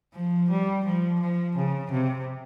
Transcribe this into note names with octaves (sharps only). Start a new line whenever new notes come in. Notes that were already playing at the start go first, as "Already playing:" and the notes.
F3
G3
F3
F3
C#3
C3